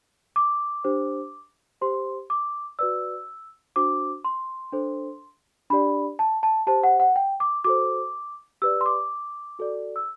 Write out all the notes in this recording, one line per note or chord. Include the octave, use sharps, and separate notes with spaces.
D6
D4 G4 C5
G4 C5 C6
D6
F#4 B4 D5 E6
D4 F#4 C5 D6
C6
D4 A4 C5
D4 G4 D5 B5
A5
A5
G4 C5 A5
F#5
F#5
G5
D6
F#4 A4 C5 D6
G4 B4 D5 E6
C6
D6
F#4 A4 D5
E6